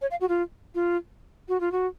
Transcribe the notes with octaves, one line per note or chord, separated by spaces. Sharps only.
C#5
F5
F#4
F4
F4
F#4
F4
F#4